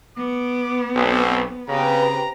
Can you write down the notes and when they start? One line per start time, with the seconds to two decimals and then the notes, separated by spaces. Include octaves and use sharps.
0.17 B3 D6
0.96 B1 C4
1.69 C#3 C4 G4 B4 A#5